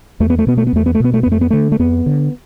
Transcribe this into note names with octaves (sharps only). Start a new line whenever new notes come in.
E2 A3
B3
A3
B2 B3
A3
B3
E2 A3
B3
A3
B2 B3
A3
F2 B3
A3
B3
D3 A3
A3
F2 B3
D3